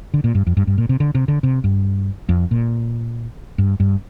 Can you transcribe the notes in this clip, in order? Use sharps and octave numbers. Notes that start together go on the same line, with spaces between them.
D3
A#2
G2
F2
G2
G2
A#2
C3
D3
C3
D3
C3
G2
F2
A#2
G2
G2